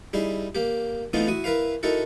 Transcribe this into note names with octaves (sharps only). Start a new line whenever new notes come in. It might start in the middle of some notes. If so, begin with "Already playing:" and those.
G3 D#4 E4 G#4
A#3 G4
E3 A3 B3 C4 D#4 F4
E4 F#4 D#6
E4 A#4 B4 F5
D#4 E4 F#4 A4 A#4